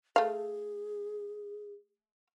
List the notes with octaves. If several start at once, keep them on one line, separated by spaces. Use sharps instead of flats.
A3 G#4 F5